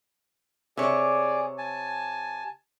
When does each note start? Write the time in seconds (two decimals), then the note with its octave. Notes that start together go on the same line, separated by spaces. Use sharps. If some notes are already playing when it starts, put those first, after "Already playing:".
0.77 C3 G#4 C#5 D5
1.58 G#5 A5